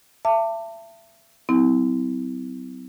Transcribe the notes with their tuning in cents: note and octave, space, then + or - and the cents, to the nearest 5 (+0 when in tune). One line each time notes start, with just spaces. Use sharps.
E5 +30 A5 +30 D6 +0
F#3 +25 C4 -40 E4 -30